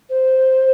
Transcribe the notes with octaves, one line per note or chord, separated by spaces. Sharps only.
C5